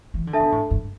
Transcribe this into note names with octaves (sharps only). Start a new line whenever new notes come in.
E3
D3
D4 A4 E5 A5
B2
A2
G2